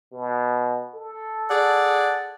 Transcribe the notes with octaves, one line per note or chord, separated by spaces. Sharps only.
B2
A4
G#4 D5 F#5